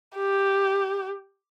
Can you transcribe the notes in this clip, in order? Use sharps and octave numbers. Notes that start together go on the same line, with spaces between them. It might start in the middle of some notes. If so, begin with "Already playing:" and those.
G4